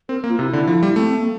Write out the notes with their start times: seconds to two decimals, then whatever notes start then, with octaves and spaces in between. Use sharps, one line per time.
0.09 C4 A#4
0.24 A#3
0.29 F4
0.38 C3 E4
0.53 D3
0.67 F3
0.83 G3
0.96 A3 C4
1.06 C4
1.16 A#3